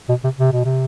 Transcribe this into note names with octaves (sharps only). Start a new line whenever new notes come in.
B2
C3
C3
B2
C3